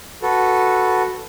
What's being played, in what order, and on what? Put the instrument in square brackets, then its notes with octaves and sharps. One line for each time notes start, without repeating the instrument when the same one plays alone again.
[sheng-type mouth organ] F#4 A4 B4